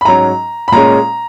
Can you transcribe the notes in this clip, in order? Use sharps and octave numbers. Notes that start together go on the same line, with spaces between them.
B5
G#2 F#3 C#4 A#5
B5
A#2 G#3 C#4 A#5